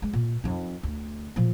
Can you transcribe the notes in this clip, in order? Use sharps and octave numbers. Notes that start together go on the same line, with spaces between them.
G#3
A#2
F2 D#4
D2
A#2 F3